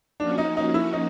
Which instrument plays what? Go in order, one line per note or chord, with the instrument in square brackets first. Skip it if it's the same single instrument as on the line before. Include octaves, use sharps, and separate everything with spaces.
[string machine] F3 A#3 C#4 F#4 [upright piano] D4
[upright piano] D#4
D#4
E4
D#4